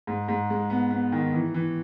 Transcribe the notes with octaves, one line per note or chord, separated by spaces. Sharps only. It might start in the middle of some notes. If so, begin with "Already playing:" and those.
G#2
G#2
G#3
B3
B3
D#3
E3
E3